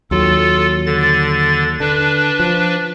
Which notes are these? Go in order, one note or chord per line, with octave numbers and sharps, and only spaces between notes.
D#2 F#3 F4 A4
D3 A6
D3 D4 B4
F3